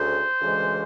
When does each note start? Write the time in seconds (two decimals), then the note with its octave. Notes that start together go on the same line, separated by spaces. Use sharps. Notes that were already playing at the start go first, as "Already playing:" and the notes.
Already playing: D2 C#3 C5
0.40 D2 C#3 E3 G#3